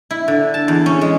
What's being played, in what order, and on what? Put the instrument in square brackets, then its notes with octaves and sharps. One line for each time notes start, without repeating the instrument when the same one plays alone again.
[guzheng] E4
D3
A5
E2
C#4
G#3